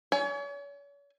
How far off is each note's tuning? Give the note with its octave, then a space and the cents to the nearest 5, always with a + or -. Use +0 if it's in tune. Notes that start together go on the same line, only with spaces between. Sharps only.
C#5 +40 G#5 +20